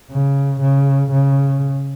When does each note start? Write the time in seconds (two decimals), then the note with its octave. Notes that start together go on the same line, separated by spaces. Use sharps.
0.11 C#3
0.61 C#3
1.11 C#3